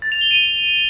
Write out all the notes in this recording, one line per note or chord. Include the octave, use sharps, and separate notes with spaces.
A6
F7
G7
D#7